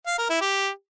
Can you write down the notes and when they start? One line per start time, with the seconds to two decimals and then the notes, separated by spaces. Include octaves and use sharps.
0.07 F5
0.18 A#4
0.30 E4
0.41 G4